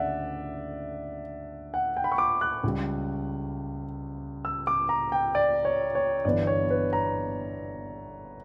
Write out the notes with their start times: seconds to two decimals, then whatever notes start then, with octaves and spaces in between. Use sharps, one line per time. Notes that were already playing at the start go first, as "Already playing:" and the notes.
Already playing: D2 C#3 D5 E5 F#5
1.74 F#5
1.97 G5
2.04 B5
2.12 C#6
2.18 D6
2.41 F#6
2.64 C#2 C#3 G3
4.45 E6
4.67 D6
4.89 A#5
5.12 G5
5.35 D5
5.65 C#5
5.95 C#5
6.25 G1 G2 E3 B3 D5
6.47 C#5
6.70 B4
6.93 A#5